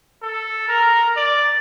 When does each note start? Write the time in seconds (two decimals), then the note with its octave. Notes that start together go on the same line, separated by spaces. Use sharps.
0.23 A4
0.68 A#4
1.17 D5